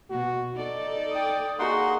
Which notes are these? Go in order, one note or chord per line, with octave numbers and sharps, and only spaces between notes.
B2 F#4
D#4 A4 D5
G5 D#6
A#3 D#4 F#4 G#4 F#5 C6